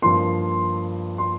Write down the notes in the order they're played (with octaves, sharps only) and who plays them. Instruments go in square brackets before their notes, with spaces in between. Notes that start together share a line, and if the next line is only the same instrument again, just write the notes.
[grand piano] G2 F3 A#3 [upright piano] C6
[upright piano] C6